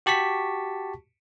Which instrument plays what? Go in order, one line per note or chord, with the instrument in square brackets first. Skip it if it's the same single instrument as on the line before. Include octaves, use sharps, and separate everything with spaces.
[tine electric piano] F#4 G4 A5 C#6 B6